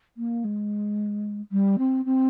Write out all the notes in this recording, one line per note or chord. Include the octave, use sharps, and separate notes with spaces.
A#3
G#3
G3
C4
C4